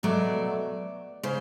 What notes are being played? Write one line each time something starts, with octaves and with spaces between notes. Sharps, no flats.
B2 F#3 A3 D5
C#3 C5